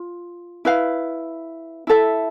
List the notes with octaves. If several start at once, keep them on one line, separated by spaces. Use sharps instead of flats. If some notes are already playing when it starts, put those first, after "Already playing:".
Already playing: F4
E4 B4 F5
E4 A4 E5